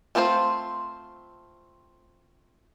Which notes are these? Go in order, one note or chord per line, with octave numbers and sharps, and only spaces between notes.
A3 C4 F4 B4 C5